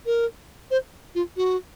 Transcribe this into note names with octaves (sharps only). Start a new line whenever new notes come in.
A#4
C5
F4
F#4